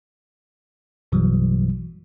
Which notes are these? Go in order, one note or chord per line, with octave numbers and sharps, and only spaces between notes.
A#1 F#2 B2 E3 F#3 G3